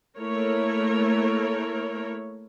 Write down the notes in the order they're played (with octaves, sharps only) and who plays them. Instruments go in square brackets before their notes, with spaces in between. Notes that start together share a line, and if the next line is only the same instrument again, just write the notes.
[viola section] A3 A#3 E4 A#4 C#5